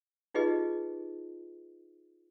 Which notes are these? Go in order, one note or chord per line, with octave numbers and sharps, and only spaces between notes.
D#4 F4 G4 G#4 B4 D#5